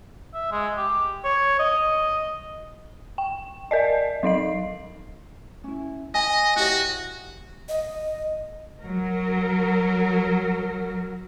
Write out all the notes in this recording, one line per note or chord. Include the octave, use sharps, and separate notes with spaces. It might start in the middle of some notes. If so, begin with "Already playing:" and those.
E5
G#3
G4
C#5
D#5
G5
A#4 D5 D#5
F#3 D#4 F5 C7
C#4 E4
D#5 G#5 A#5
E4 F#4 G4 C#5
D#5
F#3 A#4